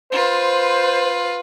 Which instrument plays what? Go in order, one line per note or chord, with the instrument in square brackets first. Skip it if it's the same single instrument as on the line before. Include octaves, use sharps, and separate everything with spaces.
[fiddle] F4 B4 [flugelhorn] C5